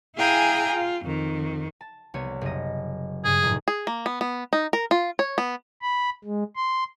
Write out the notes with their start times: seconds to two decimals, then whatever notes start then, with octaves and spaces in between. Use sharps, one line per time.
0.17 E4 G#4 F5 G5 G#5 A#5
0.73 F4
1.04 F2 D#3
1.81 A5
2.14 C2 B3 C#5
2.41 F#1 D#5
3.24 G2 C#3 G#4
3.43 F1 A2
3.68 G#4
3.87 A#3
4.06 B3
4.21 B3
4.53 D#4
4.73 A#4
4.91 F4
5.19 C#5
5.38 B3
5.82 B5
6.24 G#3
6.56 C6